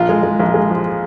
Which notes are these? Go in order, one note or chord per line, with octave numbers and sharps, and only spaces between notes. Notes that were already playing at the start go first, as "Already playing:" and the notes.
Already playing: A#1 F4
G#3
G#3
A#1
G#3
F3